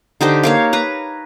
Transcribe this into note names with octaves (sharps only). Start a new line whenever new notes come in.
D3 D#4 G4 C5
A#3 C#5 F5
B4 A#5